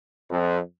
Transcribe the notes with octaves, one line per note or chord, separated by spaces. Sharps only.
F2